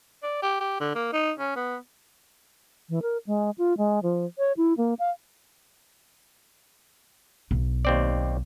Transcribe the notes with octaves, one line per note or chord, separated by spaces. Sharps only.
D5
G4
G4
D3
A#3
D#4
C#4
B3
E3
A#4
G#3
F4
G#3
F3
C#5
E4
A#3
F5
B1
D#2 C4 D5